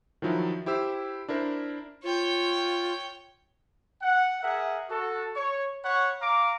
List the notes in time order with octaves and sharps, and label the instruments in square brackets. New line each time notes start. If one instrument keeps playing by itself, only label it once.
[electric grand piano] D#3 F3 F#3 E4
E4 G4 C5 E6
D4 E4 A#4 C5
[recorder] F4 [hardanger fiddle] C#5 G5
[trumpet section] F#5
G#4 A#4 E5 F#5
F#4 A4
C#5
C#5 F#5 B5 C#6
F5 A#5 D6